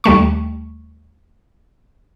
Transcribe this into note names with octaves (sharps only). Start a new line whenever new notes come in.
D#2 G3 A3 C#6